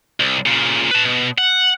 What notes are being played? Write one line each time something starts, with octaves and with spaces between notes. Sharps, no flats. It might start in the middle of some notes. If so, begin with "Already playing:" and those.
C2
A#2 C#3
B4 A5
B2
F#5